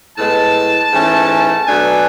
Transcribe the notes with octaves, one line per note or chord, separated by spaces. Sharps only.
A2 G#3 B3 A5
G#2 E3 A3 C#4
B2 F#3 A3 D4 G#5